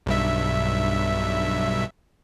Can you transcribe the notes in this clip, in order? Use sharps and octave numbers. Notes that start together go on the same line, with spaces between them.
B1 G2 E5